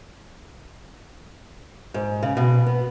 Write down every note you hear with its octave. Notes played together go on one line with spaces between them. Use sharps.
G#2
C#3
B2
B3